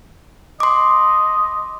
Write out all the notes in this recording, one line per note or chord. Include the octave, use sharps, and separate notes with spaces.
D#5 C6 D6